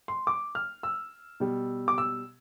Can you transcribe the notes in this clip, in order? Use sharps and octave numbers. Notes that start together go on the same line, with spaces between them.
C6
D6
F6
E6
B2 G3
D6
E6